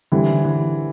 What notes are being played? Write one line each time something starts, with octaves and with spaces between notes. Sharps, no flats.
D3 E3 G3 C4 E4 G4
E3